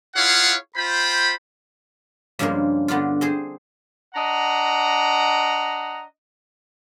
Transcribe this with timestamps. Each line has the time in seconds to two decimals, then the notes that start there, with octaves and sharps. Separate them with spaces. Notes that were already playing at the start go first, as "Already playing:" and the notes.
0.16 E4 F4 G#4 C#5 F5 F#5
0.76 F4 C5 G5 B5
2.39 G2 C#3 F3 G#3 A#3
2.88 D3 B3 D4 F4
3.21 C4 G#4 C5
4.15 D4 D#5 F#5 A#5